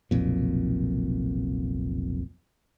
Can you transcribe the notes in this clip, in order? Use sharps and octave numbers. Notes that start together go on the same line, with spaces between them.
F1 B1 F2 A#2